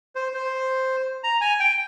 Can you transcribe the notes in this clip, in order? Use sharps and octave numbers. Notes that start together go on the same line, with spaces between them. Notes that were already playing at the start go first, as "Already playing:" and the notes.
C5
C5
A#5
G#5
G5